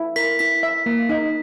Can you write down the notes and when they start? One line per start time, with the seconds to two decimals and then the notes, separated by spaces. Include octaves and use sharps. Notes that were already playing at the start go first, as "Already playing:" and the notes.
Already playing: E4
0.16 A#4 B6
0.39 E4 B6
0.63 E5
0.86 A#3
1.09 D#4